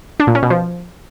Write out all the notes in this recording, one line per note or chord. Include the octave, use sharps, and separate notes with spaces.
D4
A#2
C#4
B2
F3